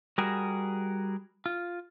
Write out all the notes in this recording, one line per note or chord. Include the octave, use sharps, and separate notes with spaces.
G3 F#4 G#4 A#4
F4